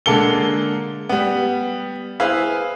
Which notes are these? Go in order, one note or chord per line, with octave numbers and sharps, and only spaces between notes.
D3 G#3 A#3 A4 C#7 G7
G3 B3
E4 G#4 B4 C5 F5